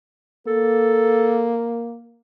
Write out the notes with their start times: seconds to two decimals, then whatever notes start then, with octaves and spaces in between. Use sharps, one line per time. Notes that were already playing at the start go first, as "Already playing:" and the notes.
0.47 A#3 A4